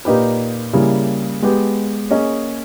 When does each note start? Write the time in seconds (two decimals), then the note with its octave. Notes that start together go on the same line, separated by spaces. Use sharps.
0.05 A#2 A#3 D#4 G4 B4
0.73 C#3 G3 A#3 E4 G#4
1.42 G#3 B3 G4
2.10 A#3 C#4 G#4 D#5